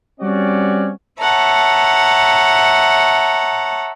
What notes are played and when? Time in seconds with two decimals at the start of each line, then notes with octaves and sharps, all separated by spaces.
0.21 G3 C4 C#4 F#4 D5
1.20 C#5 E5 F#5 A5 A#5